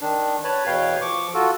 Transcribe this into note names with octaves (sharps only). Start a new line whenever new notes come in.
D#3 D4
B4 C#5 A5 B5
E2 B2 B4 C#5 F5 G5
F3 C#6 D6
F4 F#4 A4